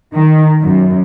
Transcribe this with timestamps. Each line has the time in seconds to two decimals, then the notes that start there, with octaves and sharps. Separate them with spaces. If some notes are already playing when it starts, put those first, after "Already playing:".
0.14 D#3
0.62 F#2